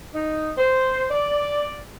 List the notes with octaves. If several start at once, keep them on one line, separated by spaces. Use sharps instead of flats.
D#4
C5
D5